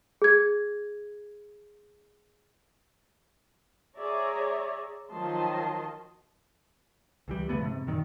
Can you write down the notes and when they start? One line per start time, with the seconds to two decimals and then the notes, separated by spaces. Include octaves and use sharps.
0.22 G#4 G#6
3.97 G#4 C#5 D5 E5 A#5
5.12 D#3 F3 F#3 D#5 A5 C6
7.28 C#2 E3 G3
7.49 C#3 F3 A3 B3
7.61 G#2 C3
7.87 F#2 A#2 D#3